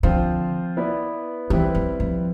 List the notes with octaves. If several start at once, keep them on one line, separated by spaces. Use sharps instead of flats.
D3 F3 C4 F4 C5
B3 E4 B4 D5
E3 G3 C4 E4 B4
F3
F3